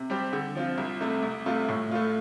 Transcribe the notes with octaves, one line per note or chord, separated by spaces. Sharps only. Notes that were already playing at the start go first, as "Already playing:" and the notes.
Already playing: C3
G3 C4 G4
D3
F3 C4 F4
C2
C3 A3
C2
C3 A3 F4
A2
A3 F4